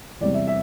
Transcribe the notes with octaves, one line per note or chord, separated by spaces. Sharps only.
E2 C3 G3 D5
E5
E5